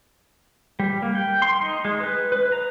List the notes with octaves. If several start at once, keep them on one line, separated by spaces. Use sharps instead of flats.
G3
A#3
G5
C6
D#4
G#3
B4
B4
A#5